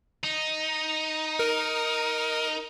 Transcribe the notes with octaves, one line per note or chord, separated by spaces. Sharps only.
D#4
A#4